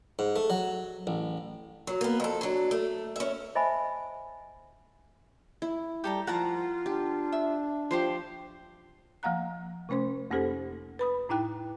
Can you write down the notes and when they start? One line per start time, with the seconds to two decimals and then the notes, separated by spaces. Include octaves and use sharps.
0.19 G#2
0.36 A3
0.50 F#3
1.07 A1
1.87 F#3
2.01 A#3 B3
2.20 F2 A4
2.41 F#3 D4
2.71 A3
3.16 C#4 E5
3.55 C5 D#5 E5 G#5 A5 B5
5.62 E4
6.04 G3 G4 A4 A#5
6.27 F3 F4 A#4 F#5 A5 A#5
6.86 D4 G4
7.32 E5
7.91 F3 G4 C5 C6
9.23 F3 A#3 F5 F#5 A#5 F#6
9.89 C3 A3 C#4 C5 C6
10.31 F2 A#3 C#4 G4 A4 C5
10.99 B4 B5 D#6
11.29 A2 D#4 E4 G5 F#6